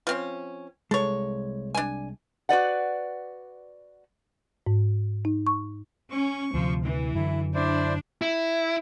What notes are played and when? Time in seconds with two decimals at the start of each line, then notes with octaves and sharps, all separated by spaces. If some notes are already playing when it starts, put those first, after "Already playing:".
0.07 F3 C4 C#4
0.91 C2 G#3 A4 C#5
1.75 D4 G#5
2.49 F#4 B4 D5 F#5
4.67 G#2
5.25 D#4
5.47 C#6
6.10 C#4 C#6
6.54 D2 C3 F3
6.85 E3
7.15 F#2 D3 E4
7.55 D4 E4 C5 D5
8.22 E4